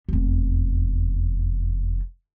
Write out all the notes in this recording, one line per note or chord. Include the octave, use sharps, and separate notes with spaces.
F1 E2